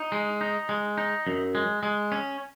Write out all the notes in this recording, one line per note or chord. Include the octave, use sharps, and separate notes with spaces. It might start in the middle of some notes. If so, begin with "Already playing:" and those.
Already playing: D#4
G#3
D#4
G#3
D#4
F#2
G#3
G#3
C#4